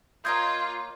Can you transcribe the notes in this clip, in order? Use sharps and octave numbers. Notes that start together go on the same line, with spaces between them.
A#3 F4 C#5 D#5 G6 G#6